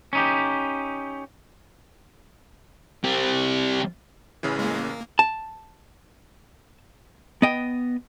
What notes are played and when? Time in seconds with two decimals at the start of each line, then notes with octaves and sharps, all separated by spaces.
0.13 C#4 D#4 G4
3.04 G3 C4
4.43 A1 C#3 E3
4.59 G#3 A#3
4.78 A#3
5.19 A5
7.42 B3 D#5 G5